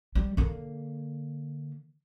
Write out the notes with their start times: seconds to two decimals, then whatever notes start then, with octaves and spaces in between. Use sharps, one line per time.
0.15 G3
0.37 D3 A#3